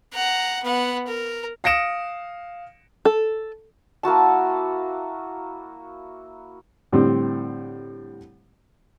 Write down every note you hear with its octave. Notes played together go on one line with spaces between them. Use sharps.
F#5 A#5
B3 F#5
A#4
F5 D#6 A#6 C#7 D7 E7
A4
A#3 E4 F#4 A5
A2 D3 G3 C4